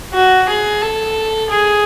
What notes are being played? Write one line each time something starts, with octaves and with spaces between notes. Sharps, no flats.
F#4
G#4
A4
G#4